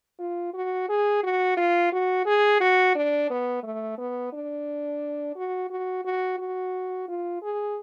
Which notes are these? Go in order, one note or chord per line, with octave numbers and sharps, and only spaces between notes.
F4
F#4
G#4
F#4
F4
F#4
G#4
F#4
D4
B3
A3
B3
D4
F#4
F#4
F#4
F#4
F4
G#4